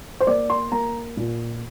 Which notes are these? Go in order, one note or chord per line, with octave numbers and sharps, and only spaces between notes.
C5
A#3 D5
C6
A#3 A#5
A#2